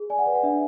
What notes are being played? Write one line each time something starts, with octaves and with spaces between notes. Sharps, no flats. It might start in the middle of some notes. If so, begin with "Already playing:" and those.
Already playing: G#4
D5 G#5
F#5
B4 D5
F#5
D4 E5